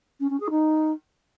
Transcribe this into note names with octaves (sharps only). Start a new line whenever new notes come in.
C#4
C#4
G#4
D#4